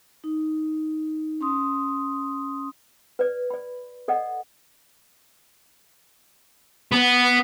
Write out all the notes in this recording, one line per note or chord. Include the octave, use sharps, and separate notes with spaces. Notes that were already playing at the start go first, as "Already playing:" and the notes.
D#4
C#4 C6 D#6
B4 D5
D5 B5
A4 D5 D#5 F#5
B3